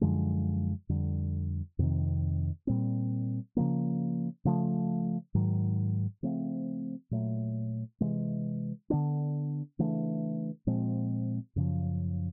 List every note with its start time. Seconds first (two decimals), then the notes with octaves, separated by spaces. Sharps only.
0.01 F#2 D3 F3 G#3
0.89 F2 D3 G3
1.79 F2 C3 D#3
2.67 A#2 G3 C4
3.57 C#3 F3 A#3
4.45 C#3 F3 A3
5.35 G#2 D#3 F#3
6.23 C#3 F3 A3 C4
7.11 A#2 F#3 A3
8.01 C3 E3 G#3
8.90 D3 F#3 B3 D4
9.79 C#3 E3 A3 D4
10.67 A#2 F3 G#3 C4
11.56 F#2 C#3 F3